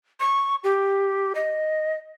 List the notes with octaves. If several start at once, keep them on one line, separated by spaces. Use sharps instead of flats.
C#6
G4
D#5